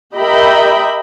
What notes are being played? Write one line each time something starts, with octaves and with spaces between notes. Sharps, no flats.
G4 A#4 D#5 E5 G5 B5